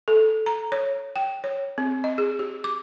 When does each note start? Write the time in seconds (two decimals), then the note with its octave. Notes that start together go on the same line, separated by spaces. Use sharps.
0.08 A4
0.46 A#5
0.72 C#5
1.16 G5
1.44 C#5
1.78 C4
2.04 D#5
2.18 G#4
2.39 G4
2.64 D6